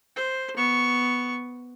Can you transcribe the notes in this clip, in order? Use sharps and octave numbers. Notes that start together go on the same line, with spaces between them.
C5
B3 C#6